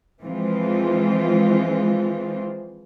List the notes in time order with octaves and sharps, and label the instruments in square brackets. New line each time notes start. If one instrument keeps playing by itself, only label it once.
[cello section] E3 F3 G#3 C4 F4